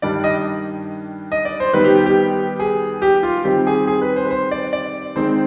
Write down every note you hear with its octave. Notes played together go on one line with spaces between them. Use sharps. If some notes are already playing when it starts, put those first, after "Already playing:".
G2 D#3 G3 D4 D5
D#5
D#5
D5
C5
D#3 G3 B3 D#4 B4
G4
G4
G4
G#4
G4
F4
D#3 G3 C4 G4
G#4
G#4
B4
C5
B4
C5
D5
D5
D#3 G#3 C4 D#4 C5